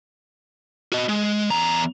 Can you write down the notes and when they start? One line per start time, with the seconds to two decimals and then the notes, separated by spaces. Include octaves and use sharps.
0.92 F#4 D#5
1.09 G#3
1.51 E2 A#5